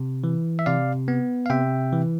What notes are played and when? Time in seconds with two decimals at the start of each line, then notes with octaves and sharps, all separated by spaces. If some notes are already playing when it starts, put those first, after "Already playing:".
Already playing: C3
0.24 E3
0.59 E5
0.66 C3 D5 F5
1.08 B3
1.46 F5
1.50 C3 E5 G5
1.93 E3